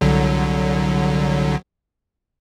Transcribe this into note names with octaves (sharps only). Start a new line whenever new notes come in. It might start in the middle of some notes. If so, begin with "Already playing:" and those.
C2 D3 F#3